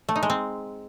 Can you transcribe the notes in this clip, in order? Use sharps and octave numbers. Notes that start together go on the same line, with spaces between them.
A3
D#4
G#3
C4